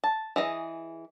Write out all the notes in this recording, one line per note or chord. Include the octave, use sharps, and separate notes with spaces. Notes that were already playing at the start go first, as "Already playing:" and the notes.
A5
E3 G#4 D#5